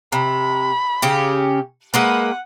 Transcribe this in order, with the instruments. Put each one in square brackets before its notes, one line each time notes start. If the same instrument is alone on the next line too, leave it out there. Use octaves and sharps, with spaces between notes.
[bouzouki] C3 [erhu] B5
[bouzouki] C#3 C#4 G4
[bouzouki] G#3 A#3 B4 [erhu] F#5